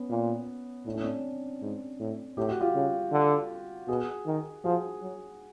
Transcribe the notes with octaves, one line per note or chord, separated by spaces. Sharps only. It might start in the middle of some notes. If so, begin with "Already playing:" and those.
Already playing: B3 C#4
A#2
A2 D4
C#4
C4 D4
G#2
A2
A2 G4
F#4
F4 G4
C#3
D3
B2 F#4 G#4
D#3
F3 F#4 G#4
F#3